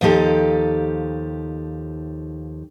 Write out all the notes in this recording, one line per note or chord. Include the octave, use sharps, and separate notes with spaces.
D#2 F3 D#4 G4 A4